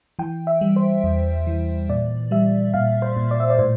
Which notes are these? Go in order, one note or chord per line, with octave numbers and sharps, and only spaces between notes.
E3 G5
E5
G3
C5
E2
E3
A#2 D5
G3 E5
A#2 F5
C5
A#2
D5
E5
D5
A2 C5